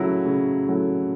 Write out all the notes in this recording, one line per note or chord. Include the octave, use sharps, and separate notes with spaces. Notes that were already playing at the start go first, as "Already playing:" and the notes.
Already playing: C#3 F#3 A3 E4
C#3
F#3 A3 E4